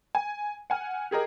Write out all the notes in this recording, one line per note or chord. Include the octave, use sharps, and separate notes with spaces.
G#5
F#5 G#5 F6
G4 G#4 A#4 D#5